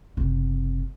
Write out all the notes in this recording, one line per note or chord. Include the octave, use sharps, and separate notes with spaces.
F#1 C3